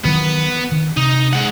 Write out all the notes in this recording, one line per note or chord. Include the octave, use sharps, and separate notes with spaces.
D#3 E3 F#3 B3
D#3
C3 D#4
G#3 F#5